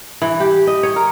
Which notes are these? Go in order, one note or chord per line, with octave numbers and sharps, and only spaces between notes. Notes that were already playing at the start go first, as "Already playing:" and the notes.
E3
G4
D#5
C#5
A#4